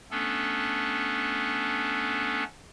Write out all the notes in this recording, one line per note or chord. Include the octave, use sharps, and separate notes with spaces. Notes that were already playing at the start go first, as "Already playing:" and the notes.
A3 B3 C#4 D4 A4